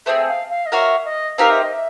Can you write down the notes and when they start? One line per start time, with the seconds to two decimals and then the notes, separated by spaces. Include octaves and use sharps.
0.06 A3 C4 D#4 G#4 E5
0.28 F5
0.49 F5
0.66 D#5
0.72 F#4 A#4 C#5 E5 F5
1.05 D#5
1.38 C4 D#4 G4 A#4 F5
1.50 E5
1.62 D#5
1.73 E5